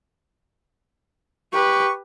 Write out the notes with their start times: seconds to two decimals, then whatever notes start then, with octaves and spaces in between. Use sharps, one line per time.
1.53 G4 B4 C#6